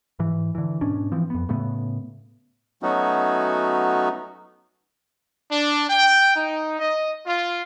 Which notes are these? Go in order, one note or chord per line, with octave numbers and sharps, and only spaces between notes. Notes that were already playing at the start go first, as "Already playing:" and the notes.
G#2 E3
D3 E3
G#2 B2 C#4 D4
E3 F3 C4
F2 B3
A2 C#3 A3 B3
F#3 A3 B3 C#4 D#4 F#4
D4
G5
D#4
D#5
F4